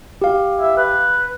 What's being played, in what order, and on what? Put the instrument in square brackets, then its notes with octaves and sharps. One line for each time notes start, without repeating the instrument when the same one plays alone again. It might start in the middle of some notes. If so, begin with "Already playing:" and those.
[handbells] G4 F5
[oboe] E5
B4